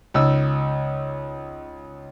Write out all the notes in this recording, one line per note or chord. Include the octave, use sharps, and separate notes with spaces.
C#2 D#4 E6